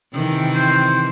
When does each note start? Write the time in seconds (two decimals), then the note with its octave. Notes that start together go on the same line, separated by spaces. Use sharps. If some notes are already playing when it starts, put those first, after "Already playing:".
0.12 C3 D#3 E3
0.54 C5